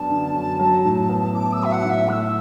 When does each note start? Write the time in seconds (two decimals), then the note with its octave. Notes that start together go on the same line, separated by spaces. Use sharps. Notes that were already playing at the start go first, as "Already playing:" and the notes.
Already playing: F#2 B3 D4 A5
0.10 D3
0.35 F#2
0.60 F#3
0.85 A2
1.09 B3
1.34 E4 D6
1.53 E6
1.59 F#3 E5
1.71 F#5
1.83 A2
1.90 E5
2.08 A3 F#6
2.12 E6